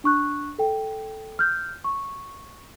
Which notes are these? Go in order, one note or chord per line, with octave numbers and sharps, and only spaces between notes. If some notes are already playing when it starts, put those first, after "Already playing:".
D4 C#6 F#6
A4 G5
F6 G6
C#6